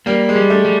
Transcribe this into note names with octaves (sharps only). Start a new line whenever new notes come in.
G3 A#3
G#3
G3
A3
G3